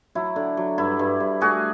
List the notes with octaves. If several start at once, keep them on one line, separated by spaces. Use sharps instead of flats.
F#3 E4
D3
F#3
G2 E4
G2
G2
A3 F#4 G#4